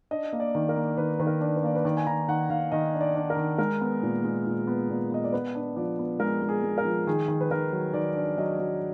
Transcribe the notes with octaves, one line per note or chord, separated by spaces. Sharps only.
D4 D#5
A#3
D5
D#3
A#4
A#3
D#3 B4
D#3 B4
A#4
D4
B4
A#3 D5
B4
D#3 D5
G#5
D#3 A#5
D#3 F#5
D#3 F5
D#3 D#5
D4
D5
D4
A#4
D#3
G#3 A#4
B3
A#2
G#3
A#2
B3
A#2
B3 D#5
D5
B3 B4
D4
F3 D5
B3
G#3 A#4
G#3
G#4
G#3
A#4
F3
D#3 G#4
D#3
B4
D#3 A#4
F#3
D#3 D5
D4
F#3 D#5
F#3